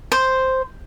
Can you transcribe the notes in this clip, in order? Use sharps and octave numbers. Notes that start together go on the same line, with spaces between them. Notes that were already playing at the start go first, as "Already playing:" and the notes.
C5